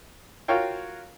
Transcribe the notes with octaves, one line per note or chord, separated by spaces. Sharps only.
F4 F#4 A#4 C#5 F5 G5